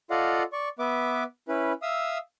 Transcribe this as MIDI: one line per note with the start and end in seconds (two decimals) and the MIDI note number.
0.10 0.43 65
0.10 0.43 69
0.10 0.43 74
0.10 0.43 75
0.10 0.43 77
0.10 0.43 78
0.53 0.69 74
0.53 0.69 85
0.79 1.24 59
0.79 1.24 71
0.79 1.24 76
0.79 1.24 86
1.48 1.73 61
1.48 1.73 64
1.48 1.73 71
1.82 2.18 76
1.82 2.18 77
1.82 2.18 87
1.82 2.18 88